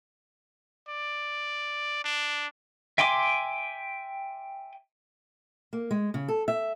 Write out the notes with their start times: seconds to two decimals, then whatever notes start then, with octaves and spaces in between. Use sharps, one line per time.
0.89 D5
2.04 D4
2.98 E5 G5 G#5 C6 D6
5.73 A#3
5.91 G#3
6.14 C#3
6.28 A4
6.48 E5